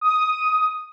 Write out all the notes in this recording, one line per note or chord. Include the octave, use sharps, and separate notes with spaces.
D#6